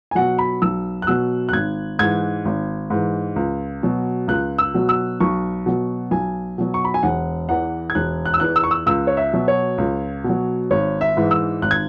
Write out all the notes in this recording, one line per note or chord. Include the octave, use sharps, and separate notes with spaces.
G#5
B2 F#3 F#5
B5
B1 E6
F#6
B2 F#3 E6
F#6
G#1 G#6
G#2 E3 G#6
G#1
G#2 E3
C#2
B2 F#3
C#2 F#6
E6
B2 F#3
E6
B1 C#6
B2 F#3
B1 G#5
B2 F#3
C#6
B5
G#5
E1 F#5
E2 E3 F#5
G#6
E1 F#6
F#6
E6
E2 E3 F#6
E6
C#6
E6
C#2 E6
C#5
E5
B2 F#3
C#5
C#2
B2
F#3
G#1 C#5
E5
G#2 E3
E6
G#1 F#6
G#6